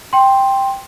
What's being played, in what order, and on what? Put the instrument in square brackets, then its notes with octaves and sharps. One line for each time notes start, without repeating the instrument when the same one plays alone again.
[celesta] G5 C6